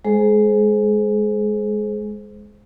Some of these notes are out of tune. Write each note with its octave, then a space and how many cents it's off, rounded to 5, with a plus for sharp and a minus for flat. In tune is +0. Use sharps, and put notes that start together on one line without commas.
G#3 +0 G#4 +35 C5 +0